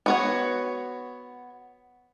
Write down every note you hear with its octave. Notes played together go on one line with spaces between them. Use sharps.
B3 F#4 C#5